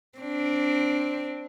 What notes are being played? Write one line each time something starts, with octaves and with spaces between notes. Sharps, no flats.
C4 D4